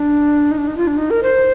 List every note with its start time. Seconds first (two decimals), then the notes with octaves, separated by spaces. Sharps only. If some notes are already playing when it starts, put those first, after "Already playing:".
Already playing: D4
0.51 D#4
0.58 D4
0.67 D#4
0.77 F4
0.87 D4
0.97 D#4
1.10 A#4
1.23 C5